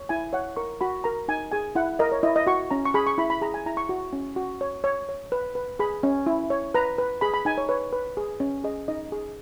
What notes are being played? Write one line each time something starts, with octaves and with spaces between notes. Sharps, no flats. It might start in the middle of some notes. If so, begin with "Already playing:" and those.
Already playing: C#5
E4 G#5
C#5 F#5
A#4 C#6
F#4 B5
A#4 A#5
D#4 G#5
G#4 G#5
E4 F#5
A#4 D#5
C#5
E4 D#5
D#5
F#4 C#6
C#4 A#5
C#6
G#4 B5
C#6
E4 B5
B5
G#4 A#5
G#5
E4 A#5
C#6
F#4
C#4
F#4
C#5
C#5 C#6
C#5
B4
B4
G#4 B5
C#4
E4
C#5
B4 A#5
B4
G#4 B5
B5
D#4 G#5
C#5
B4 C#5
B4
G#4
C#4
G#4 D#5
D#4 D#5
G#4